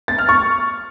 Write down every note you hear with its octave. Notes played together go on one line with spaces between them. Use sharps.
A6
F6
C#6